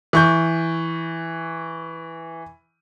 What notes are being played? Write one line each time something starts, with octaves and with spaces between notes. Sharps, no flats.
E3 C#6 G6